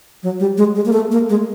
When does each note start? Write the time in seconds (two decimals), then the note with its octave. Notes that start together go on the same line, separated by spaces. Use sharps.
0.23 F#3
0.40 G3
0.57 G#3
0.75 G#3
0.86 A#3
0.93 A3
1.12 A#3
1.29 G#3